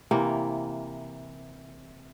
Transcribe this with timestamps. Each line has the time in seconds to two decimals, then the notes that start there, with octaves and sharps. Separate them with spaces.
0.11 C3 E3 A#3